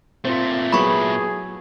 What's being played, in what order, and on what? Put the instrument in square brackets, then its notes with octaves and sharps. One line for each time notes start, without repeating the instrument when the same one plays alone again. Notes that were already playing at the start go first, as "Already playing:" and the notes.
[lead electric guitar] A#2 A3 [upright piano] C4 F4
[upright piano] F#3 B3 E4 [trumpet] G#4 [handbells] B5 C#6